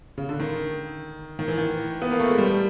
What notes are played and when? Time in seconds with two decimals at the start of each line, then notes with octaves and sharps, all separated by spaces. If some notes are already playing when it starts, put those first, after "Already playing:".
0.18 C#3
0.29 D3
0.40 D#3
1.39 D#3
1.48 E3
1.58 D#3
2.02 B3
2.11 A#3
2.19 A3
2.29 G#3
2.38 G3